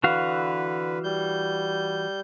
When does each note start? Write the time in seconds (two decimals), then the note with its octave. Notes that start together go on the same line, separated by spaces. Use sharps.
0.04 D3 E3 F#4 B4 F5
1.04 G3 G6